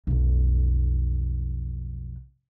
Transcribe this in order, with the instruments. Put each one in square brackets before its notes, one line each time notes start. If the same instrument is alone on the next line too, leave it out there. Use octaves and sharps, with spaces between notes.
[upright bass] B1 F2